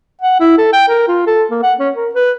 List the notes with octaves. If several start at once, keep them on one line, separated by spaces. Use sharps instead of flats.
F#5
E4
A4
G5
A#4
F4
A4
A#3
F#5
C#4
A#4
B4